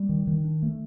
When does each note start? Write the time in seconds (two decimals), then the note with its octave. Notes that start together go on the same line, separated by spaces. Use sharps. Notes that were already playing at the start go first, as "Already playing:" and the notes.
Already playing: G3
0.09 D#3
0.27 D#3
0.44 D4
0.62 A3